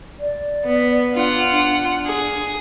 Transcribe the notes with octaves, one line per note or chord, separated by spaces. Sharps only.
D5
B3
D4 F4 F#5
D4
G#4